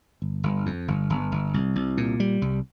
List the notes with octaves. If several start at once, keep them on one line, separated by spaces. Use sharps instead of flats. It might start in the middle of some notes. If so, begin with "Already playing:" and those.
G1
G1
F2
G1
G1
G1
C2
C2
A#2
G3
C2